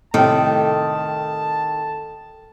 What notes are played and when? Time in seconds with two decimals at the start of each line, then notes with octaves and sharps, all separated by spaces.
0.14 A2 C3 D#3 A4 G5 A5